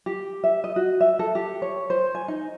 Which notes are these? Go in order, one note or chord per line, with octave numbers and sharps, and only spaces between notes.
G4
E5
D#5
F#4
E5
A4
G4
C#5
C5
G#5
D#4